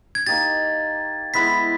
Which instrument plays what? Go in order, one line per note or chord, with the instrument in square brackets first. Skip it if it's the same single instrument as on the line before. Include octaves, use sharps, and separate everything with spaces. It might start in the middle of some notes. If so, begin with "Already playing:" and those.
[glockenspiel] G#6
[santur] A#3 D#4 G4 [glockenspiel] A6
[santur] G#3 B3 E4 [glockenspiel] B6